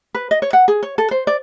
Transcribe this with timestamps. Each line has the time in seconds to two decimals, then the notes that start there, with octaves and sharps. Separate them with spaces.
0.14 B4
0.31 D#5
0.42 C#5
0.53 F#5
0.68 G#4
0.83 C#5
0.98 A4
1.11 C5
1.27 D5